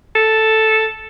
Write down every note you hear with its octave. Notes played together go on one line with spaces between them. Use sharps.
A4